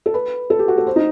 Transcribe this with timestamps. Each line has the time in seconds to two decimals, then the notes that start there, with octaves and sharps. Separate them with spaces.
0.06 A4
0.14 B4
0.50 A4
0.59 G4
0.68 F#4
0.78 A4
0.87 C5
0.96 D#4